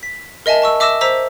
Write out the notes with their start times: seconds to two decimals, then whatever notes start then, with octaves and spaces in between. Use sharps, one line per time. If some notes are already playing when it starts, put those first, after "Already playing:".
0.03 B6
0.46 A#4 D#5 E5 G#5 A5
0.62 A5 C#6 E6
0.80 E5 D6 E6 A#6 E7
1.01 C5 A#5 E6 B6